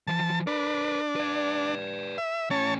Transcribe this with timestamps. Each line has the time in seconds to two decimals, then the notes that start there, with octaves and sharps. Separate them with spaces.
0.07 E3 F3 A5
0.47 D4 A#4 B4
1.16 B4 D5
2.18 E5
2.51 A2 C#4 C#5 A5